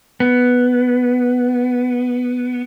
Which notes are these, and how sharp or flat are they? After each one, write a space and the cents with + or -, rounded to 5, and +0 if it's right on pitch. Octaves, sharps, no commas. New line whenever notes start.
B3 +0